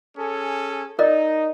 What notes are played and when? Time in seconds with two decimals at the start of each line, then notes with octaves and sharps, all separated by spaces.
0.17 C#4 G#4 A4
0.99 D#4 A#4 D5 D#5